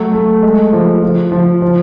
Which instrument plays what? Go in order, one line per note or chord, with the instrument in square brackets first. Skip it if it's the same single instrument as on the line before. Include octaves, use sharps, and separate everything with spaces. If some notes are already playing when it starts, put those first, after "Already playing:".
Already playing: [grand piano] F#3 A3
A3
G#3
F3
F3
F3
F3